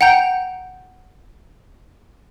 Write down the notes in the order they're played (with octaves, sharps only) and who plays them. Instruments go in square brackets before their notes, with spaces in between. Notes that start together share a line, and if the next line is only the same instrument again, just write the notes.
[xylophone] F#5 G5 A#5 G6